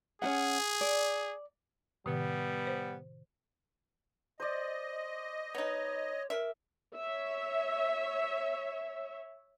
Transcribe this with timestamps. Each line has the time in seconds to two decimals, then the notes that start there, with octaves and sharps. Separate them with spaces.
0.22 C#4 D#4 G#4 F#5
0.81 D5
2.06 A2 C3 D#3 G3 B3
2.67 C5
4.40 C5 D5 D#5
5.55 B3 D#4 C#5
6.30 A#4 E5
6.95 C#5 E5